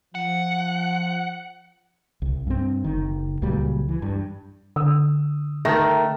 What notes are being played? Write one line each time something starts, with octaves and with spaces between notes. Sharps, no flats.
F3 F#5
C2
G2 C4
F#1 D#3
C#2 A#2 F#3 G3
E3
G2
D3 D#6 E6
D#3 A3 A#4 A#6